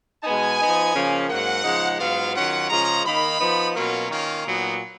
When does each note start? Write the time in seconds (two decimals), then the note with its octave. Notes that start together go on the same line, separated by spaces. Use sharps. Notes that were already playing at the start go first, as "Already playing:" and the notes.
0.24 B2 G#3 B3 D#4 G#5
0.59 F3 B3 D#4
0.94 C#3 F3 A#3 C#4
1.29 G#2 F#3 A#3 F#5
1.64 C#3 F3 G#3 D#4
1.99 G#2 F#3 B3 F4 F5
2.34 D#3 F#3 C#4 F4 F#5
2.69 C#3 F3 G#3 C#4 F4 A#5
3.05 D#3 A#3 D#4 B5
3.39 F3 B3 D#4
3.74 B2 F#3 A#3 C#4 F4 A#5
4.09 D#3 A#3 C#4 F4
4.45 A#2 F#3 B3 D#4